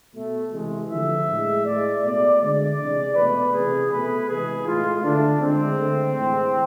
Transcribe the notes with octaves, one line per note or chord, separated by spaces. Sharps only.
B2 A3
C3 E3 G#3
D3 F3 A3 E5
A2 G#3
A2 G#3 D5
B2 A3 D5
D3 G#3 D5
C3 E3 G#3
B2 A3 B4
C3 E3 A3 G#4
B2 A3 B4
C3 E3 G#3 G#4
A2 G#3 F4
D3 A3 D4
D3 G#3 C4
D3 A3
A2 E3 G#3